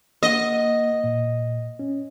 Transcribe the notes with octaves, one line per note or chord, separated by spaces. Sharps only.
A#3 D#5 F#5
A#2
C#4